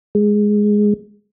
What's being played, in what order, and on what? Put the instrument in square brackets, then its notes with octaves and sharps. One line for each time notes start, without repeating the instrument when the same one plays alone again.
[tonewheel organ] G#3